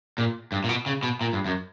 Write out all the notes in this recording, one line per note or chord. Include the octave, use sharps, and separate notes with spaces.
A#2
G2
A#2
B2
C#3
B2
A#2
G2
F#2